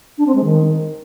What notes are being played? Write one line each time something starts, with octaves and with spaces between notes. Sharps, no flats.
D4
C4
G#3
D#3